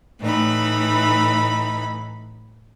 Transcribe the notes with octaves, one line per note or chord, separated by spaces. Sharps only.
A2 E3 D#4 B5